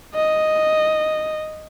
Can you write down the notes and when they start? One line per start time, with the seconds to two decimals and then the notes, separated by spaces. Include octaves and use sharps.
0.15 D#5